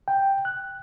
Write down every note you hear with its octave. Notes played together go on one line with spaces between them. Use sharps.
G5
F#6